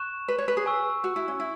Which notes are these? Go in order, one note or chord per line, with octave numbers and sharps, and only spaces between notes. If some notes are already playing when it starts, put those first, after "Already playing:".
Already playing: C#6 F#6 E7
B4
C#5
B4
G#4
G#5 C#6 E6
F#4
E4
C#4
E4